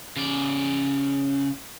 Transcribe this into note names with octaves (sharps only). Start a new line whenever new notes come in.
C#3 D5